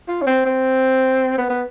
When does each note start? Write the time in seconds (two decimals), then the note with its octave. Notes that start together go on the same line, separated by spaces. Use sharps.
0.08 F4
0.22 C#4
0.27 C4
0.46 C4
1.38 B3
1.50 B3